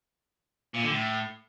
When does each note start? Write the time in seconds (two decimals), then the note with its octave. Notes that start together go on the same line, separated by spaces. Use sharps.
0.74 A#2
0.83 D3
0.91 A2